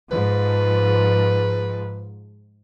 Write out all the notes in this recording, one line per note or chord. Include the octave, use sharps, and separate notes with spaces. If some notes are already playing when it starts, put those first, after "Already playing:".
G#2 F3 B4